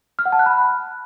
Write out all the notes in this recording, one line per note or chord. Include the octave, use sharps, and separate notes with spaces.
F6
F#5
A5
F#6
B5